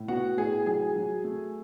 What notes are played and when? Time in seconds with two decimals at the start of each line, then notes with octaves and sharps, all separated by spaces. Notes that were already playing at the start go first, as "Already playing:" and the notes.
Already playing: A2
0.08 B3 F#4 F#5
0.37 A2 G#4 G#5
0.66 F#3 G#4 G#5
0.96 F#3
1.24 A3